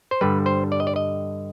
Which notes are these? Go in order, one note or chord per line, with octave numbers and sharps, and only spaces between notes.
C5
G2 D3 G3 B4
C5
D5
D#5
D5
D#5